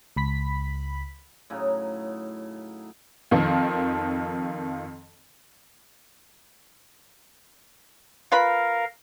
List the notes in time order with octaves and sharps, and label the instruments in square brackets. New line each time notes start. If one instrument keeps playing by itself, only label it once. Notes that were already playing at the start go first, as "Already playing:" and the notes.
[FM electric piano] C#2 B5 B6
[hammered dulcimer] A2 C#3 F#3 D#4
[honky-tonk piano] F2 D#3 F3
[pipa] F4 B4 B5 [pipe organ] A#4 F5